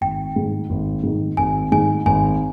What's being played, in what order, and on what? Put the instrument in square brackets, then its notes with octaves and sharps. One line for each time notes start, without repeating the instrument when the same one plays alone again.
[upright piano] G#1 [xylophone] G5
[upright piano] G#2 D#3
G#1
G#2 D#3
[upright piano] G#1 [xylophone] G#5
[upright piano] G#2 D#3 [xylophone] G#5
[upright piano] G#1 [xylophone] G#5